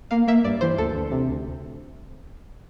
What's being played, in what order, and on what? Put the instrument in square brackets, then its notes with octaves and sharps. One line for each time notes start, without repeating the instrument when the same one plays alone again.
[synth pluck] A#3 F5
A#3 E5
G2 D5
E3 C5
D2 A4
D2
C3
D2